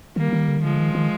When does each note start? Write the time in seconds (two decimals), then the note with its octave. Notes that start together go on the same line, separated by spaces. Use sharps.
0.16 D#3 G3 A#3
0.33 D#3
0.48 D3
0.57 D#3
0.64 D3 F3 G#3
0.79 D#3
0.95 D#3